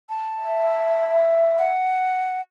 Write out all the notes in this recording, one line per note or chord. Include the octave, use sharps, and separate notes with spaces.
A5
E5
F#5